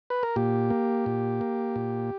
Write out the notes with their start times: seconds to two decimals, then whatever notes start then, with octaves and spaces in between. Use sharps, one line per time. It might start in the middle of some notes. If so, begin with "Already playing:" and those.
0.10 B4
0.23 A#4
0.36 A#2 G4
0.70 A#3
1.06 A#2
1.41 A#3
1.76 A#2